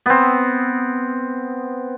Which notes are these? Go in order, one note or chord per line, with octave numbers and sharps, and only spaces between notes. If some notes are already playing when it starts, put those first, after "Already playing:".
B3 C4